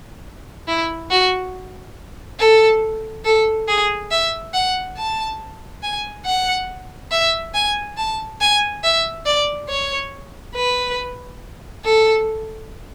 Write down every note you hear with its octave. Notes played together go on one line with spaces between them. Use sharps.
E4
F#4
A4
A4
G#4
E5
F#5
A5
G#5
F#5
E5
G#5
A5
G#5
E5
D5
C#5
B4
A4